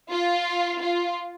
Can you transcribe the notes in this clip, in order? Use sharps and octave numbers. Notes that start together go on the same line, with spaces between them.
F4
F4